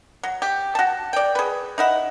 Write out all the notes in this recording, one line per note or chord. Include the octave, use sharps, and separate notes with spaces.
F#3
G4
F#4 A5
D5 G5
G#4 B4
D#4 E4 F#5